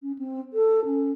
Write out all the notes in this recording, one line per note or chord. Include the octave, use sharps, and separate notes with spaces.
C#4
C4
A4
C#4